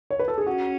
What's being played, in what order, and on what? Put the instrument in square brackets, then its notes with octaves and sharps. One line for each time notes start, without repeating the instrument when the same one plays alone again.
[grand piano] C#5
B4
A4
G#4
[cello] C#4 [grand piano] F#4